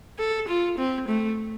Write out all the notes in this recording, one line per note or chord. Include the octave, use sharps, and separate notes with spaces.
A4
F4
C4
A3